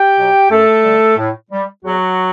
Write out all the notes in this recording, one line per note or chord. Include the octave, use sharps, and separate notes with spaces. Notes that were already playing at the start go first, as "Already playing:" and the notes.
Already playing: G4 G5
B2 F#3
F#2 A3 A4
D3 G3
A2
G3
E2 F#3 F#4